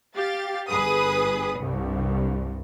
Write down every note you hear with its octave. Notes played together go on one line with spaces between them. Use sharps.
G4 F5 A6
G1 G#4 B4 D#6
C2 G2